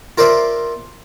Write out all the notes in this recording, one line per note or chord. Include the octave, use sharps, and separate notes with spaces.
F4 A#4 C5 D5 E5